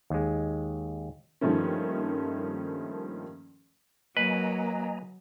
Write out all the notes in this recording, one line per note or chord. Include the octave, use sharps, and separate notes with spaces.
D#2 G#3
G2 D#3 F3 A3 A#3 C#4
F#3 A#3 B4 D#5 G#5 A#5